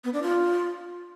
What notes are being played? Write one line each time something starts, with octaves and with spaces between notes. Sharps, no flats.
B3
D4
F4